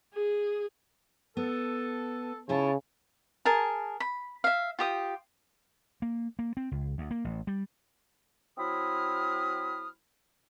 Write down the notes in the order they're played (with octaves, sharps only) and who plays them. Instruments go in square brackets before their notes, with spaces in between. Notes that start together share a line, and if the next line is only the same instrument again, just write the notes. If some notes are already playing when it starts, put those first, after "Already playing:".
[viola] G#4
[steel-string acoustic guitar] B3 [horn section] A4
[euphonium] C#3 [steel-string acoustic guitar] E4 F4 [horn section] C#5 A5
[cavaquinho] G#4 A#4 A5
B5
E5 F5
F4 G4 D#6
[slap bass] A#3
A#3
C4
C#2
D2
A#3
A1
G3
[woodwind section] F#3 C4 E4 B5 D#6 F6